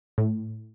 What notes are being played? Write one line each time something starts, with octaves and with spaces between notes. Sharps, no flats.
A2